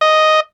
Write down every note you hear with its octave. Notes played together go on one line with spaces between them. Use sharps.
D#5